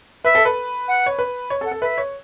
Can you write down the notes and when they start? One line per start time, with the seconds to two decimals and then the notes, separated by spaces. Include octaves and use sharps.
0.24 B4 E5
0.35 A4
0.45 B4
0.88 F#5
1.06 C#5
1.19 B4
1.50 C#5
1.61 A4
1.66 F#5
1.71 A4
1.81 B4 E5
1.98 C#5